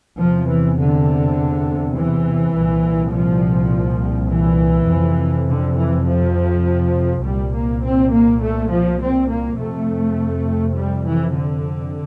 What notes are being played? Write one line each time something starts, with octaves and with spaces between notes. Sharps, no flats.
E2 C3 F3
E3
D3
E3
C2 A#2
F3
E3
F2 C3
D3
E3
F3
C2 A#2 G3
A#3
C4
A#3
A3
F3
C4
A#3
F2 C3 A3
G3
E3
D3